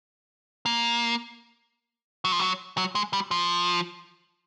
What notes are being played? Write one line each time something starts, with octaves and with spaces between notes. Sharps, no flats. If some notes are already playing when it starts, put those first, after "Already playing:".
A#3
F#3
F3
F#3
F#3
G#3
G3
F3